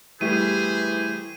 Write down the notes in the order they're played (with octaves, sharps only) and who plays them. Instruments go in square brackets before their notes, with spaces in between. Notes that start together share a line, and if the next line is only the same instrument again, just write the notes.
[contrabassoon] E3 [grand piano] G3 A3 G4 [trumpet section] G#4 C5 [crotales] D#7